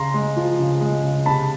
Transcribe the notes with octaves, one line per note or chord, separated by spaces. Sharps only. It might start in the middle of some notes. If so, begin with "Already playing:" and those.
Already playing: C#3 A#5 C6
G#3
F3
C#3
G#3
C#3
C3 A5 B5